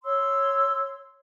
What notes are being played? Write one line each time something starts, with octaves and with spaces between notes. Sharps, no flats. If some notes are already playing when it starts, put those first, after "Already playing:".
C#5 C6 E6